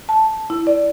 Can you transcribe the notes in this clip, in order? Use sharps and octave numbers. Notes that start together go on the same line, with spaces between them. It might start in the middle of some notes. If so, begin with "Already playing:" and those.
A5
E4
D5